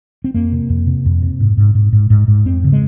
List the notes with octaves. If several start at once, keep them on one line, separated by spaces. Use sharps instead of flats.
C4
F2 A#3
C3
F2
C3
F2
C3
G#2
G#2
G#2
G#2
G#2
G#2
F2 C4
C#3
G#3